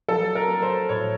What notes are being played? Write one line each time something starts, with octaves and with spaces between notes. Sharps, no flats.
F#3 A4
A#4
F#3
C5
A2 C#5